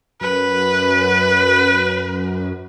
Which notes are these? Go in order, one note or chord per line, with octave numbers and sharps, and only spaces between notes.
F#2 B4